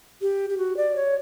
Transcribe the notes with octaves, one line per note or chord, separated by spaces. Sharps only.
G4
G4
F#4
D5
C#5